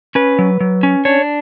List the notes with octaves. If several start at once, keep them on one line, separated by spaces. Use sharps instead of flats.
C#4 B4
F#3
F#3
C#4
D4 C#5